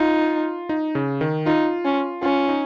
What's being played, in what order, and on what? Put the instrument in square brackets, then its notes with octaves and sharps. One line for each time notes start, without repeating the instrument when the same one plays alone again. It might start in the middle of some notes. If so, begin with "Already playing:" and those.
Already playing: [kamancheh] D#4 [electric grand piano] F4
[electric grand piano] D#4
C#3
D#3
[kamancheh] D#4 [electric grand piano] F4
[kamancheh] C#4
[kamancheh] C#4 [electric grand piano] F4
[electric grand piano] D#4